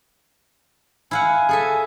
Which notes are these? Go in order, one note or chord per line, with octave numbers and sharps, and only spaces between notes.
E4 F5 F#5 G#5
G#4 A4 E5